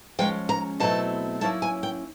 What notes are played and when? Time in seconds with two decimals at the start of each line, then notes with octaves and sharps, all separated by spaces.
0.19 F3 G#3 C#4 G5
0.49 A#5
0.80 B2 F#3 A3 C4 E4 A5
1.41 F#3 A#3 C#4 E4 A5
1.62 G#5
1.83 G5